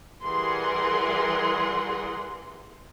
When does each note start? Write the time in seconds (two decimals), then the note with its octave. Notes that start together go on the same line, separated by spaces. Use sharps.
0.23 E3 G3 G#4 A#4 F#5 C6